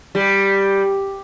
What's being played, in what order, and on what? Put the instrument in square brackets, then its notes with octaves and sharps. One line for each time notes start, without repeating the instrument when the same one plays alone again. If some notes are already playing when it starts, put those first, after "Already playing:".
[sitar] G3